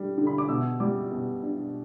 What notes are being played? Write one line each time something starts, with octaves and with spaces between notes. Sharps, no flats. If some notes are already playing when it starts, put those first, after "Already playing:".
Already playing: D3 G3
D3
B5
D6
B2 E6
G3 D6
B2
D4